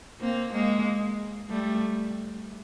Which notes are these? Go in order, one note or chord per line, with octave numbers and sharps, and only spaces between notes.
A#3 C4
G#3 A#3
G3 A3